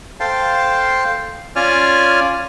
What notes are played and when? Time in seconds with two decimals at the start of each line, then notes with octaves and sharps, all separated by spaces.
0.20 A4 C5 F5 G5 A5
1.56 C#4 F4 D5 G#5 F6